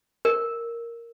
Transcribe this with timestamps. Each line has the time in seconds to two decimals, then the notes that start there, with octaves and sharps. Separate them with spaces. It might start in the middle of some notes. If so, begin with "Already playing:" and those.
0.25 A#4